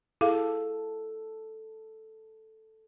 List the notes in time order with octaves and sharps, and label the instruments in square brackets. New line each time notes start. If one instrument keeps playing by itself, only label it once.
[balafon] E4 G#4 F5 [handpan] A4